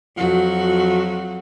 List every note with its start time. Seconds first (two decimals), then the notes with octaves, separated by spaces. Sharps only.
0.17 F2 F#3 F#4